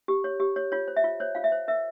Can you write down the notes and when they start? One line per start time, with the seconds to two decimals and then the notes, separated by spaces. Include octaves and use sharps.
0.08 G4
0.24 C#5
0.40 G4
0.56 C#5
0.72 F4 C#5
0.88 C5
0.96 E5
1.04 F4
1.20 C5 C#5
1.35 F4 F5
1.44 E5
1.52 C5
1.68 A#4 E5